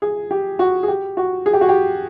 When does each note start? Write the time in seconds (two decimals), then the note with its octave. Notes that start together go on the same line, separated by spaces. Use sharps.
0.02 G#4
0.31 G4
0.59 F#4
0.83 G#4
0.88 G4
1.17 F#4
1.46 G#4
1.53 G4
1.61 F#4
1.69 G4